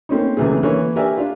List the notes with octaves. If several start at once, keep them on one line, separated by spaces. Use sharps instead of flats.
A#3 C4 C#4 D#4
C#2 C3 E3 A3 G#4
D3 E3 A#3 C#5
G4 A#4 B4 D5 E5 G#5
D4 F4